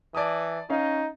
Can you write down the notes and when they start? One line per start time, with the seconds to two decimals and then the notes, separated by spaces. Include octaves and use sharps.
0.15 E3 D5 A5 D#6
0.70 C#4 D#4 F5